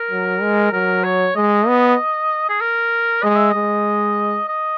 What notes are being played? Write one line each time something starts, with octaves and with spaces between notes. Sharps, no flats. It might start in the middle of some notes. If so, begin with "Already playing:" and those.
Already playing: A#4
F#3
G#3
F#3 A#4
C#5
G#3 D#5
B3
G#4
A#4
G#3 D#5
E5
G#3 D#5
D#5